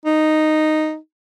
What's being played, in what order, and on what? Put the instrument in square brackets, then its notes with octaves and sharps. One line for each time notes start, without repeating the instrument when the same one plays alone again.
[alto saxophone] D#4